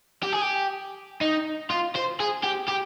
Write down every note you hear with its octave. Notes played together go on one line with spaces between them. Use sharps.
G4
G#4
G4
D#4
F4
C5
G#4
G4
G4